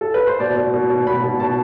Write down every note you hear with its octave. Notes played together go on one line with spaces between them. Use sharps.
A4
B4
C5
B2 D5
B2
B2
B2
B2 B5
B2
B2 A5